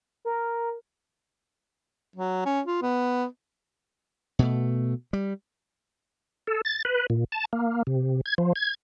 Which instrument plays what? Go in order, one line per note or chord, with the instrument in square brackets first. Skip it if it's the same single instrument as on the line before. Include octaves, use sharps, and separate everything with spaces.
[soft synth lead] A#4
[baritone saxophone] F#3
C#4
F4
B3
[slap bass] B2 A3
G3
[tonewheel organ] A4
A6
B4
A#2
A5
A#3
C3
G#6
F3
G#6